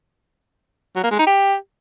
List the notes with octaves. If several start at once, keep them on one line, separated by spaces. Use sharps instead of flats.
F#3
A#3
G#3
D#4
G4